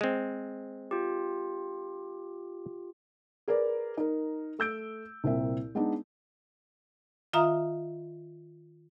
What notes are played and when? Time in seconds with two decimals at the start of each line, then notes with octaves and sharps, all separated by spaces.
0.01 G#3 C4
0.91 F4 G4
3.48 G#4 A#4 B4 D5
3.97 D#4 A#4
4.59 A3 E6 G6 D7
5.24 C2 A#2 C4 E5
5.75 G#3 B3 D4 D#4
7.33 D#3 F4 E5 F5 A#5 D#6